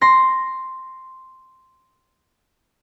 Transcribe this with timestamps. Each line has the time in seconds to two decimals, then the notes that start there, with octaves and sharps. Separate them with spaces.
0.01 C6 A#6